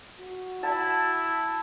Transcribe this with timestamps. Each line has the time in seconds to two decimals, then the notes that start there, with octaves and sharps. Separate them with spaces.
0.19 F#4
0.63 E4 A5